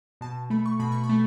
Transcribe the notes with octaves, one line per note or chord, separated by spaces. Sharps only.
B2 A5
A3 B5
C#6
B2 B5
C#6
B5
A3